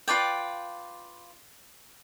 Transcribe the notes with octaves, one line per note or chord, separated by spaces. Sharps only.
F4 B4 D5 G5